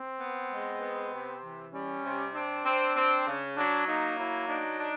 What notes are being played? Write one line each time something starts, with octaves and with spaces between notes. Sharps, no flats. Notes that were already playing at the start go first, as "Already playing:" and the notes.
Already playing: C4
B3
G#3
B3
C3
E3
G3 C#4
C3
C4 D4
C4
C4
C#3
F#3 D4
A#3 D#4
F#3 E4
D4 D#4
D4